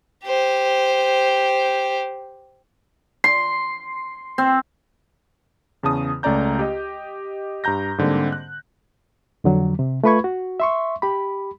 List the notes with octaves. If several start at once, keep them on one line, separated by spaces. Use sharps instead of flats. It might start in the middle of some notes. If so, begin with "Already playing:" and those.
G4 C5
C6
C4
E2 C#3 A5 D#6
C#2 A3 C#4 D5 A#5 G6
G4 D#5
G2 G4 A#5 G6 A#6
G#2 D3 G3 A#3 C4
F#6
F2 D3 F#3
C3
A3 F4 B4 B5 C#6 G#6
F#4
E5 C6 C#6
G4 B5